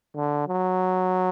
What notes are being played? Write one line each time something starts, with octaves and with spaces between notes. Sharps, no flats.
D3
F#3